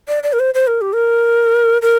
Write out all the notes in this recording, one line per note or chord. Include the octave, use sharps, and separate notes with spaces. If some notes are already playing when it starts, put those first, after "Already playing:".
D5
D5
A#4
C5
C5
A#4
G4
A#4
A#4